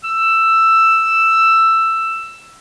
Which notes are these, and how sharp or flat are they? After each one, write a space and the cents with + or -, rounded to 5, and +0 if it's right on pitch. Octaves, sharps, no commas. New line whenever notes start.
E6 +10